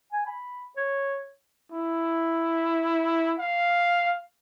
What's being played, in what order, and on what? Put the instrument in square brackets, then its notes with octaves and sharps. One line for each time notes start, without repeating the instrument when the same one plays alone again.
[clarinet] G#5
B5
C#5
[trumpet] E4
F5